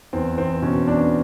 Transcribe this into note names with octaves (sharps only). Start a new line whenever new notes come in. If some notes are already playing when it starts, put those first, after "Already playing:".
E2 C4
E2 C4
B2 C#4
E2 D4